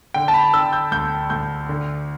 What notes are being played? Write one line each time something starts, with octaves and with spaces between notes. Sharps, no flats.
D3 G5
A5
B5
D3 E6
G6
D2 G6
D2 G6
D3